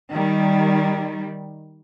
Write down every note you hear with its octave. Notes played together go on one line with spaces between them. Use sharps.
D#3 G3